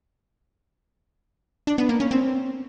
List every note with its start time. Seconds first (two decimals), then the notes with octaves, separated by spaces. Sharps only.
1.67 D4
1.78 B3
1.89 A#3
2.00 C#4
2.11 C4